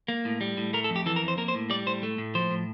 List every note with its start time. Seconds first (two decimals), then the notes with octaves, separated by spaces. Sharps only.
0.08 A#3
0.25 A2
0.41 G3
0.57 A2
0.73 A3 A#4
0.84 A4
0.90 F2
0.96 G4
1.06 E3 A4
1.16 A#4
1.22 F2
1.28 C5
1.37 A#3 A#4
1.48 C5
1.55 A2
1.70 G3 D5
1.86 A2 C5
2.03 A3
2.18 A2
2.35 F3 C5
2.51 A2